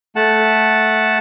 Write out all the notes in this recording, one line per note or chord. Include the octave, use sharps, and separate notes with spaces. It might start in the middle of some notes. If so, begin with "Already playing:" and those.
A3 F#5 A5